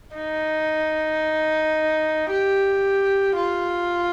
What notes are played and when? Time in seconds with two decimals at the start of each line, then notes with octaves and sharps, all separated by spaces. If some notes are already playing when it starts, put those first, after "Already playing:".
0.16 D#4
2.30 G4
3.36 F4